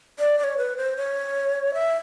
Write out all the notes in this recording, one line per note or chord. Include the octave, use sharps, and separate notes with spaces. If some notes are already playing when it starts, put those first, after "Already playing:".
D5
D5
C#5
B4
C5
C#5
E5